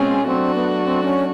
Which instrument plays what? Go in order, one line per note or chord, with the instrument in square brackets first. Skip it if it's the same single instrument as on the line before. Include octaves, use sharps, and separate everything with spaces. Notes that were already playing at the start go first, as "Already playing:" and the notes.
Already playing: [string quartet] B2 G#3 C4 F4 G#4 [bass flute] C#4
[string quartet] F#3 A3 D4 F#4 [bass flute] C4
[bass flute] B3
C4
C#4